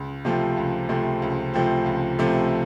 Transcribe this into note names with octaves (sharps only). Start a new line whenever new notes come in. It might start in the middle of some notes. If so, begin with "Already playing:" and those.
Already playing: C#2
C3 F3 A3 C4
C#2
C3 F3 A3 C4
C#2
C3 F3 A3 C4
C#2
C3 F3 A3 C4